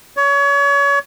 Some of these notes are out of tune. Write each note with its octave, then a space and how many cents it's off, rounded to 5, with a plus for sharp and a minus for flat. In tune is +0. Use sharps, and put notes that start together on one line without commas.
C#5 +30